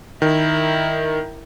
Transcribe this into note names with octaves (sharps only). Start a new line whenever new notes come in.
D#3 E4 A#4